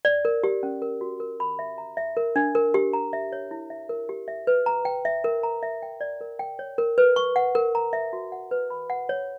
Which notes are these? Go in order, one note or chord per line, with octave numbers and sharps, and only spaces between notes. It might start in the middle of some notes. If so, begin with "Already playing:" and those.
D5
A#4
G4
C#4
A#4
F#4
A#4
B5
E5
A#5
E5
A#4
D4
A#4
G4
A#5
E5
C#5
E4
E5
A#4
G4
E5
B4
A#5
G5
E5
A#4
A#5
E5
G5
D5
A#4
G5
C#5
A#4
B4
C#6
F#5
A#4
A#5
E5
F#4
F#5
B4
B5
F#5
C#5